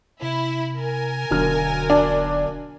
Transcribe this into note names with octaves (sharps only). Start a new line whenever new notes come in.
C3 E4
A#4 G#5
E1 B1 D3 F6
D4